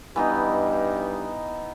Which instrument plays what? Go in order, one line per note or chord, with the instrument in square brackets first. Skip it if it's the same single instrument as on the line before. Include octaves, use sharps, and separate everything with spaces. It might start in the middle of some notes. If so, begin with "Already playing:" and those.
[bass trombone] G2 [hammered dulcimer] E3 B3 D#4